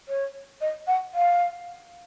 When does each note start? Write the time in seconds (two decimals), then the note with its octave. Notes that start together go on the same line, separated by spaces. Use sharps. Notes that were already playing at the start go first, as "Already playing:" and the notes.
0.08 C#5
0.61 D#5
0.87 F#5
1.14 F5